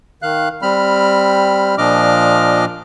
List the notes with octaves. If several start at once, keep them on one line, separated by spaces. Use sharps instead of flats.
D#3 F5 F#6
G3 C4 B5 F6
A#2 F3 D4 D#5 D6 F6